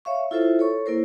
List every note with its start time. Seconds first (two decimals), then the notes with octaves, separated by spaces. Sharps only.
0.05 C#5 E5 F5 C#6
0.31 E4 F4 A4 C5 E5
0.59 A4 C#5 C#6
0.86 A#3 E4 A#4 C5